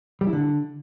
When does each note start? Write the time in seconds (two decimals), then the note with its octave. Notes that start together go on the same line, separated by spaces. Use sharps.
0.21 G3
0.27 E4
0.33 D3